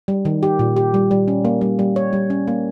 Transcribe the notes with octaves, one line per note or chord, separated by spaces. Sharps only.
G3
D#3
G4
A#2
G4
G3
G3
C#4
A#3
G3
G3
C#5
G3
C#4
A#3